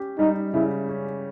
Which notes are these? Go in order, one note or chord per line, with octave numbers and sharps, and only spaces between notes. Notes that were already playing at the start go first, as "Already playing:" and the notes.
Already playing: C#4 G4
G3 D#4
C#3 E4
C#4